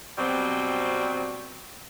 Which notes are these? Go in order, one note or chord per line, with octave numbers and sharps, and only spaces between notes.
B2 F#3 G3 C4